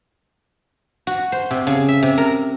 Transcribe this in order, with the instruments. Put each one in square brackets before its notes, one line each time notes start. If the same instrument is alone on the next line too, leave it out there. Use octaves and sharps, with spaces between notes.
[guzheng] F#4
C5
C3
C#3
E5
C3
A#4